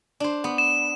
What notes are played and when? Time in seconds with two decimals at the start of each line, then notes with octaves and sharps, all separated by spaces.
0.20 D4 C5
0.44 B3
0.58 E7